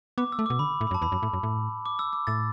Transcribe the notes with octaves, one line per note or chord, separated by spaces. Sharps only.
B3 D6
E6
A3
B2 D6
D3 B5
A2
B5
F#2
A5
E2 B5
F#2
A2
F#2
A2
D6
E6
D6
A2 E6 A6